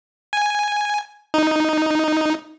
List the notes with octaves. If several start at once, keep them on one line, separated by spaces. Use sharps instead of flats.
G#5
D#4